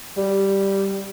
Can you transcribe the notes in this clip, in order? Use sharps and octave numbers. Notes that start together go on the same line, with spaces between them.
G3